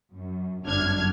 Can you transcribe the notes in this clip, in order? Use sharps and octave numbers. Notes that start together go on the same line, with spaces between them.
F#2
G1 F#2 D4 F6 G#6